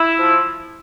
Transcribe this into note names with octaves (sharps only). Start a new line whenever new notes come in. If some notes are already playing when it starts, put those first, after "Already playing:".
Already playing: E4
F3